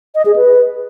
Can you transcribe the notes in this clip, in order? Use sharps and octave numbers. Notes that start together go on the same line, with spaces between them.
D#5
G#4
B4